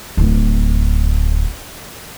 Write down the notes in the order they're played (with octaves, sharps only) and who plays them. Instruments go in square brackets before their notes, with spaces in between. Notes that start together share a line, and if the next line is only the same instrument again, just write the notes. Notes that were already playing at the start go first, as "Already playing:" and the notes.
[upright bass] D1 D2